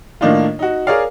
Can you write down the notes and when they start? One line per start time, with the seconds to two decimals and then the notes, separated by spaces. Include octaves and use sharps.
0.21 A2 D#3 A#3 D4 D#4 F4
0.59 D#4 F#4
0.87 G#4 A#4 C#5 D5 F5